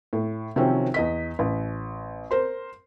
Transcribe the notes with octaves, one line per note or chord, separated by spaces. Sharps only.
A2
C3 D#3 F3 F#3 C4 C#4
E2 D#5 B6
A1
A#4 C5 C6